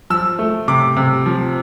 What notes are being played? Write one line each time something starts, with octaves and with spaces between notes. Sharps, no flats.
F3 E6
A3
C3 D6
C3
F3